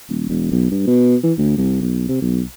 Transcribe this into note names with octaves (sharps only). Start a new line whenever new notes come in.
D#1
E1
B1
G2
B2
E3
D2
C2
B1
C3
B1